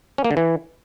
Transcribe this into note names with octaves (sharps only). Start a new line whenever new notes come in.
C#4
A#3
D3
E3